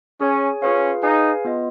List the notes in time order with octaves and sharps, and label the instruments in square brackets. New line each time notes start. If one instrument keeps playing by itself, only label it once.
[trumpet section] C#4 [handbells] G#4 C#5 G#5
[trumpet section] C#4 [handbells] F4 G#4 B4 F5
[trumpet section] D#4 [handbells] G#4 B4 F5 G#5
[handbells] B3 F4 B4 D#5